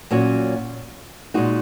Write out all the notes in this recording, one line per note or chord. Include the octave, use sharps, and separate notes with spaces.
A#2 F#3 C#4 F#4
A#2 G#3 D#4 F#4